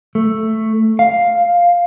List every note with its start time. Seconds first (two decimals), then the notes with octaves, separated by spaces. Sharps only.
0.15 A3
0.99 F5